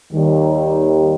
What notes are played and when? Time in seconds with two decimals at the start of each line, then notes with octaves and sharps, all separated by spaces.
0.13 D#2 D#3 G3